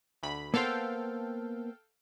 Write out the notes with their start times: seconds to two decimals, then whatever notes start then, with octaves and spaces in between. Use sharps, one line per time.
0.23 D2 B5
0.54 A#3 B3 A4 C5 F5 G5